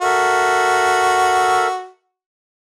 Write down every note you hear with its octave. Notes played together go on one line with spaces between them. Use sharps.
F#4 A4 A#4 E5